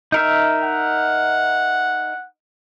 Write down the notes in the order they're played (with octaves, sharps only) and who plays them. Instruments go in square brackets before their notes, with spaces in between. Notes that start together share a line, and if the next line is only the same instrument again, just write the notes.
[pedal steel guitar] D#4 A#4 E5
[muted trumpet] F#5